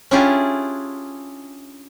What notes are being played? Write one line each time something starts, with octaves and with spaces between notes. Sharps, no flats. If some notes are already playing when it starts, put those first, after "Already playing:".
C#4 D4 E4 F4 G4 G#4